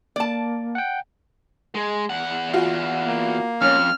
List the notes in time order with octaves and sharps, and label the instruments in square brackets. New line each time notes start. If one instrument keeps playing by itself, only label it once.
[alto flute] A#3 [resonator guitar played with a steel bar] D5 A5
[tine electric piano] F#5 G5
[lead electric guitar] G#3
E2 F#5
[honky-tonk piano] F4 F#4
[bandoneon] A#3
[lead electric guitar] F2 [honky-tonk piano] C#4 [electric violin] F6